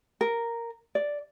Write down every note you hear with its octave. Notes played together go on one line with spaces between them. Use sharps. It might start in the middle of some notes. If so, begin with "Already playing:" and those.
A#4
D5